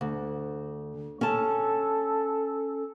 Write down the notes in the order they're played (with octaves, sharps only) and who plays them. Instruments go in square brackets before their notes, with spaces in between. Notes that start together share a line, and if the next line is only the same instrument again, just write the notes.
[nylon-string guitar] D2
[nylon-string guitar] C#4 A5 [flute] A4